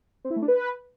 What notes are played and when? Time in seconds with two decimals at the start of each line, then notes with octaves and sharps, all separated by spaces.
0.25 C4
0.30 E4
0.36 A3
0.42 D4
0.48 B4